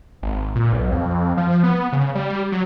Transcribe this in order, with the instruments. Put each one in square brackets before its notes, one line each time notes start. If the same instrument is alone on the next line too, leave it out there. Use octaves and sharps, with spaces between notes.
[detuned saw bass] G#1
A#2
B1
F2
F3
B3
C#3
G3
F#3